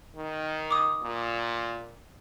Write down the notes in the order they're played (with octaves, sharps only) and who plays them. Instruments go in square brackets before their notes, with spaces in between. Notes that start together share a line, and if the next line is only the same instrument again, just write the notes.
[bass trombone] D#3
[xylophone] D6 D#6
[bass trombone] A#2